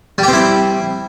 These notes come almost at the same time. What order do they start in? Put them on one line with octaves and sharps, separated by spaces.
G3 G4 C4 E4